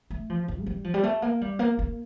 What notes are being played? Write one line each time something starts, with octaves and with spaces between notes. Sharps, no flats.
A3
F3
D#3
A3
G3
F3
G3
A3
A#3
G3
A#3
A#3